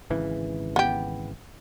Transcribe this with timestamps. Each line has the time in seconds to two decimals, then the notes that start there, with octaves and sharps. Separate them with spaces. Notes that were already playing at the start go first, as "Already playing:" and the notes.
0.10 G#1 C#3 E3
0.76 B3 G4